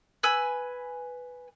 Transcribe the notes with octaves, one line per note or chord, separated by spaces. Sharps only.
B4 G#5 E6